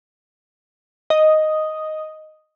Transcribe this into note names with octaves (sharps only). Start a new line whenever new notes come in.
D#5